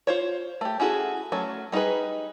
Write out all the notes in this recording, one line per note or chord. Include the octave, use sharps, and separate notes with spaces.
F4 C5 C#5
A3 G4
C#4 E4 F#4 G#4 A4
F#3 A3 C#4
G3 D#4 F#4 G#4 B4